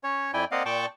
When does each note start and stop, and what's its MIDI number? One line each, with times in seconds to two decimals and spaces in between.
0.04 0.31 61
0.04 0.31 73
0.34 0.45 41
0.34 0.45 64
0.34 0.45 74
0.34 0.45 79
0.34 0.45 80
0.52 0.63 58
0.52 0.63 60
0.52 0.63 74
0.52 0.63 75
0.52 0.63 77
0.52 0.63 78
0.66 0.86 46
0.66 0.86 74
0.66 0.86 79
0.66 0.86 81
0.66 0.86 85
0.66 0.86 86